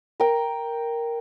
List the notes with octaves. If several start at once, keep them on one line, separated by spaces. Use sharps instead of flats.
A#4 G5